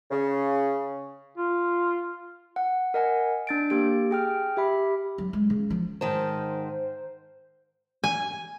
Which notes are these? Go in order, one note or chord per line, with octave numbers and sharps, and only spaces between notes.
C#3
F4
F#5
A#4 D#5 F#5 G#5
D4 A6 D7
A#3 G4 D7
G#4 G5 F6
G4 E5 B5
F#3
G#3
C#3
F3
G#2 D#3 C5 A5
G#5